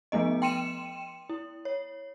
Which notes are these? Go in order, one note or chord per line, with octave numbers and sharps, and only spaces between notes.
F3 A3 B3 D#5
G5 C6 C#7 D#7 E7
E4
C#5